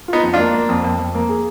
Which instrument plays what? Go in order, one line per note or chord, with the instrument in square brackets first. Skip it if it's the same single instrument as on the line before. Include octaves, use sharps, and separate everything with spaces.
[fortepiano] B3 D#4 [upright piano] F4
[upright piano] F2
[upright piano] A#3 [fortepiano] D4 F4
[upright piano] A#3
F2
F2
F2
A#3
G#4